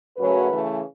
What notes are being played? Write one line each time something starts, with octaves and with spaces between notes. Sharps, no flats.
F#2 C#3 F#3 A3 C#4 F#4 B4
C#3 E3 A3